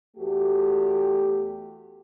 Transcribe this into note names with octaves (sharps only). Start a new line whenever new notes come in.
E2 A3 F#4 G4